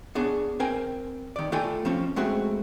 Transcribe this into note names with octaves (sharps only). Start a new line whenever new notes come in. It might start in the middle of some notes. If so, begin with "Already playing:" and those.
B3 D4 G#4 C#5
C4 A#4 G5 G#5
D#3 D5
A3 F4 A4 G5 G#5
F3 C4 C#4
G#3 A3 C4 F#4